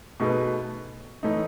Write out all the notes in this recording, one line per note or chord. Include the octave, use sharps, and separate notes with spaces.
B2 A3 D#4 G#4 B4
A2 E3 A3 D#4